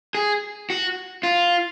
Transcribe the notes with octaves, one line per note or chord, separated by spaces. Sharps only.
G#4
F#4
F4